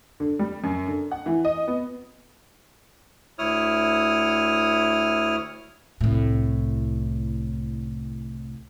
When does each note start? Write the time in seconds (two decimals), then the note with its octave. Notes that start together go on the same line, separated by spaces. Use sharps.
0.20 D3
0.39 G3
0.64 F#2
0.88 D3
1.11 F#5
1.26 E3
1.45 D#5
1.68 B3
3.39 D2 E4 C#5 D#6 F6
6.01 C2 A2